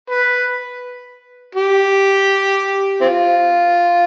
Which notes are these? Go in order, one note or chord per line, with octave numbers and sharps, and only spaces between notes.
B4
G4
C4 F4